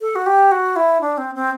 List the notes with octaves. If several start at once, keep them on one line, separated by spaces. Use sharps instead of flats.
A4
F#4
G4
F#4
E4
D4
C4
C4